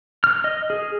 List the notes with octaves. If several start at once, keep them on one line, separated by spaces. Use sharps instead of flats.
F6
D#5
G#4